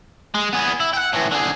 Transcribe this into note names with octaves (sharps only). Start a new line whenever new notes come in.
G#3
B3 G#4
E4
F#5 G5
A2 E3
D3 G#4